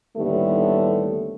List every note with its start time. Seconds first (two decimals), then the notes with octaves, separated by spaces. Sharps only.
0.17 D#2 A2 D3 G3 A3 B3